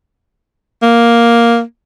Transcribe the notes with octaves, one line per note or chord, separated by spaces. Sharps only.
A#3